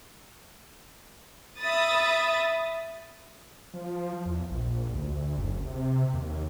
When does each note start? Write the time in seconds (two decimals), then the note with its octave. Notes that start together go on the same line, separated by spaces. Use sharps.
1.60 E5 B5 D#6 A6
3.74 F3
4.25 E2
4.51 A#1
4.94 D2
5.38 F#1
5.65 C3
6.14 D#2